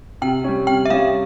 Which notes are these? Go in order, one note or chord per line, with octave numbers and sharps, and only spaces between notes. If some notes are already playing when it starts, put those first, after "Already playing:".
C3 G5
G3 C#4
C3 G5
E5
G3 C#4 F5